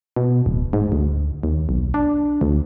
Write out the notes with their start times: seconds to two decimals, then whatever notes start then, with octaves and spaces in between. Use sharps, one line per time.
0.16 B2
0.46 D1
0.73 G#2
0.92 D2
1.43 D#2
1.69 B1
1.94 D4
2.41 D2